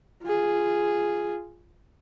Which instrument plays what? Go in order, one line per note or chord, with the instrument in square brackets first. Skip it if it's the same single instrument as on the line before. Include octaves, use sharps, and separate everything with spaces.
[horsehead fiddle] F4 G#4